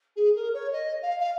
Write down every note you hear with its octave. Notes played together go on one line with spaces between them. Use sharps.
G#4
A#4
C#5
D#5
F5
F5